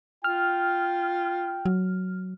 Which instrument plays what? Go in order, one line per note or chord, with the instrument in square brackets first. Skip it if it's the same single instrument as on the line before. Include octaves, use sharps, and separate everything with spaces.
[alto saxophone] F4 [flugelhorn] G5 [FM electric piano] F6
[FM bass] F#3